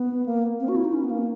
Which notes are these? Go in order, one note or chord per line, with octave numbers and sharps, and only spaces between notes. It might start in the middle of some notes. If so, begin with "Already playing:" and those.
Already playing: B3
A#3
C4
F#4
E4
D#4
C#4
B3
A#3